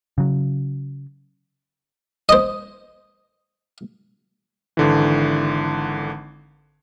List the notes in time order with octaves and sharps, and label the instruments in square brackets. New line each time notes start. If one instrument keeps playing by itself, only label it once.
[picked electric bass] C#3 F#3
[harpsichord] C5 D#5
[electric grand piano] G#1 D3 E3